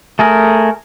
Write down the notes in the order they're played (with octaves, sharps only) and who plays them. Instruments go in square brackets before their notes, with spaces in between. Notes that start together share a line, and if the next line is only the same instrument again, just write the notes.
[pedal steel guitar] A3 G#4 A#4